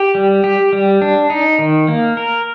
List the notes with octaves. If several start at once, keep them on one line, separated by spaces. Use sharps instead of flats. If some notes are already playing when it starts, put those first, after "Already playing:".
Already playing: G4
G3
G4
G3
D4
D#4
D#3
A#3
A#4